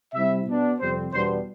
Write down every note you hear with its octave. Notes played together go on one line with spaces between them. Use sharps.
C3 G3 C4 E4 E5
B2 B3 D4
F2 C3 G3 C4 C5
E2 B2 G3 B3 D4 C5